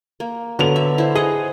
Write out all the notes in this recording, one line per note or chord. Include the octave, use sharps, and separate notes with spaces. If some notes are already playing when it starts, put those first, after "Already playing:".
A#3
D3 F#3 B3 F7
E5
E4 C5
G#4 D#5 F#5